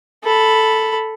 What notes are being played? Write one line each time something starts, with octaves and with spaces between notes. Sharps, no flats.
A4 B5